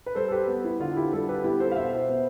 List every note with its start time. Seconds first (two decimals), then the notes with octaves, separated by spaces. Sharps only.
0.06 B4
0.15 G3 A4 C5
0.28 A4
0.32 G4 B4
0.48 B3
0.64 E4
0.80 D3 F4
0.96 E4 G4
1.12 G3 F4 A4
1.29 G4 B4
1.44 B3 E4 G4
1.60 A4 C5
1.72 F5
1.76 B2 C5 E5
1.93 C5 E5
2.09 B3